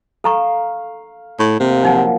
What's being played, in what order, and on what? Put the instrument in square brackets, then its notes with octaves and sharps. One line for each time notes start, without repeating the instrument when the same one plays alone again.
[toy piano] A4 A#5 C#6 [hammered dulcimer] F5
[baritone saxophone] A2
[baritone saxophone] C3 [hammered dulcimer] A#3 D6
[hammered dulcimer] F3 F#3 [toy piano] D4 D#4 F#5